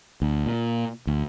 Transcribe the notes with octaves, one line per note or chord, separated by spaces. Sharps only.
D2
A#2
D2